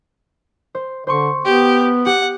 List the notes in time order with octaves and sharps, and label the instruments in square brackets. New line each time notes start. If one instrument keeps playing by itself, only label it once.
[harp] C5
[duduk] D3 [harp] C5 C6 C#6
[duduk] B3 [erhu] G4
[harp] G4 [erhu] F#5